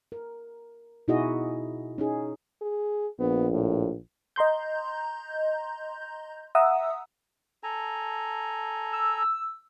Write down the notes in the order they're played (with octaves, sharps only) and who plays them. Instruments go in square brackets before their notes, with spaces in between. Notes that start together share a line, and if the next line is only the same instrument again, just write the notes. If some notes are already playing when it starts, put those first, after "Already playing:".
[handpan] A#4
B2 D#4 E4 F#4 G#4 D#5
C#4 D#4 G#4
[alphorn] G#4
[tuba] A#1 [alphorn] B3
[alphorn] A2
[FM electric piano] D#5 A#5 C6 G6
E5 F#5 A#5 D#6 E6
[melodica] A4 G#5 A#5
[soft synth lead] E6